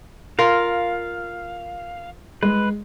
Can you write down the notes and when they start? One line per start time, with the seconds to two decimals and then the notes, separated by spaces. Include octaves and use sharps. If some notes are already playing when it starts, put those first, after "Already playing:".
0.39 F4 A#4 F5
2.43 G#3 B4